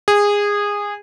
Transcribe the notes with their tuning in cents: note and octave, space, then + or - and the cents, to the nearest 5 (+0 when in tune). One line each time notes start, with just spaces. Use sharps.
G#4 -20